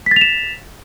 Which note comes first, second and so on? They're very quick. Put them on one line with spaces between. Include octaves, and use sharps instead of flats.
B6 A6 F7 E7